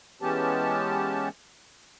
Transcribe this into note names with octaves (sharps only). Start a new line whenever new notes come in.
E3 G#3 B3 C#4 G4 A5